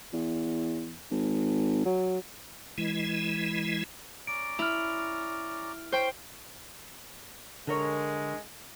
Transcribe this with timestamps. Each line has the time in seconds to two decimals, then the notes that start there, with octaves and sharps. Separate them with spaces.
0.13 E2
1.11 G#1
1.85 F#3
2.78 E3 G#3 E4
4.27 C#4 D5 A#5 D7
4.59 E4 F6 F7
5.92 C5 G5 C#6
7.67 D3 G#3 A#4 C#5